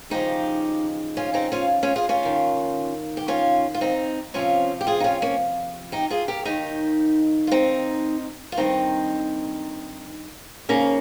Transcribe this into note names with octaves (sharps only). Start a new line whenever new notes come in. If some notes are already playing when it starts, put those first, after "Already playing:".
D#2 C#3 F3 D#4 G4
C#4 F4
C4 D#4
C#4 F4
C#4 F4
F4 G#4
C#4 F4
D#2 D#3
G4
C#4 F4
F4
C4 D#4
F2 C3 F3 C#4 F4
G4
F4 G#4
D#4
C#4 F4
A#3 C#4
D#4 G4
F4 G#4
G4 A#4
D#2 D#3 D#4 G4
F4
C4 D#4
F4
G2 D#3 C4 D#4
D#2 C#3 F3 A#3 C#4